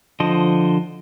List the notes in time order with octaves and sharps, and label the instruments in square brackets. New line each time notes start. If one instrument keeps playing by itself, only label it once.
[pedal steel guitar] D3 F3 C5 D#5